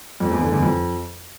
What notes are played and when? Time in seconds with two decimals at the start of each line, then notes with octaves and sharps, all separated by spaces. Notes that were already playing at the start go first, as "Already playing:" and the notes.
0.20 F2
0.31 E2
0.42 D3
0.52 E2
0.63 F2